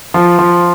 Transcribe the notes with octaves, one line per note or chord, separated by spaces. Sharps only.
F3
F3